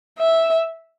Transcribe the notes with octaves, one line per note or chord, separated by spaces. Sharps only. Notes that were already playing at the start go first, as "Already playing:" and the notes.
E5